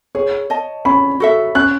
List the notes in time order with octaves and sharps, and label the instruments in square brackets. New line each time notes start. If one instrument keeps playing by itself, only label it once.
[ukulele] G#4 [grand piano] C#5
[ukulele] D#5 A5
[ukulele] C#4 [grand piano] B5
[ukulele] F#4 A4 E5
[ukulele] C#4 [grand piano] F#6